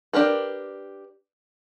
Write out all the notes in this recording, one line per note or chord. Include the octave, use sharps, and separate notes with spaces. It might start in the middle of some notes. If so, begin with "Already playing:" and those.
D4 G4 A#4 B4